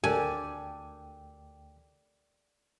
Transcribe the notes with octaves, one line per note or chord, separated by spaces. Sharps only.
D2 D4 G4 A4 A#4 G5 G#5